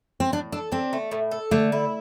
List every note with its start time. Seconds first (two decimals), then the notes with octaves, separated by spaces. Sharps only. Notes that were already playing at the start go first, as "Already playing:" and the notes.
0.20 C4
0.33 A2 D4
0.52 D4 A4
0.72 C4 D4
0.93 A3
1.11 A2
1.31 A4
1.51 D3 A3
1.72 E4